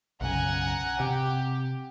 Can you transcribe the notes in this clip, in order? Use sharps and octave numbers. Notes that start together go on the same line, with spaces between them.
B1 F#2 C#3 F#5 G#5 A#5
C3 G4